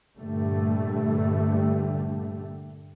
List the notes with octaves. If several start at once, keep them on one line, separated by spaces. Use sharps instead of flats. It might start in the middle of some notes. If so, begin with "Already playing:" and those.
G2 A#2 D3 G3 A3